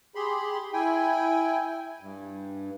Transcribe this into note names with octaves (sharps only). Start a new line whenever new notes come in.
G4 G#4 B5 C6
E4 G5 G#5
G2